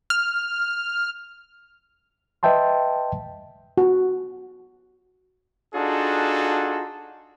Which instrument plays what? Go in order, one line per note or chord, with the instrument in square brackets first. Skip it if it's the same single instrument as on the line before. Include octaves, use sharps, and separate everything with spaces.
[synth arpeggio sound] F6
[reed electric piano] B4 D#5 E5 G5 A5 C6
[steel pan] F#4
[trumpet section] D4 D#4 F4 F#4 G#4 A4